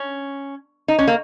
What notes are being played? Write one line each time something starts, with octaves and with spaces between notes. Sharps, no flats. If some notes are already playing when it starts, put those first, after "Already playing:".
Already playing: C#4
D#4
C#4
A#3